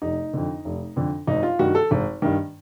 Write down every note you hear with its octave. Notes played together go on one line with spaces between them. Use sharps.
F1 D#4
F2 D3
F1
F2 D3
G#1 D#4
F4
G2 D#3 F#4
A4
G#1
G2 D#3